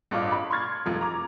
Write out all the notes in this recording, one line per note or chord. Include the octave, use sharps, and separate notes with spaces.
A1 G2 D4 F4 D6
B5
C6 C#6 F6 G#6 A6
F1 F3
A#5 D6